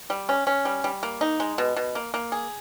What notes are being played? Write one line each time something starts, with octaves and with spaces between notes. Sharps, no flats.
G3
C#4
C#4
G3
G3
A#3
D#4
G#3
B2
B2
A#3
A#3
G#4